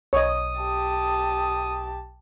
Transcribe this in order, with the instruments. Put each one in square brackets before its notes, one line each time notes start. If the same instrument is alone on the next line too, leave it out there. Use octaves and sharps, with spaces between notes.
[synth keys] B1 [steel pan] C#5 D#5 [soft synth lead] D#6
[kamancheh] G4 A5